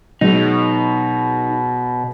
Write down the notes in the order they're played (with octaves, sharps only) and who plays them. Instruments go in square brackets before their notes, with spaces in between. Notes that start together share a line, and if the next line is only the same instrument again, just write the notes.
[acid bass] B2 [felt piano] F#3 G#3 [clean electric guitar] D#4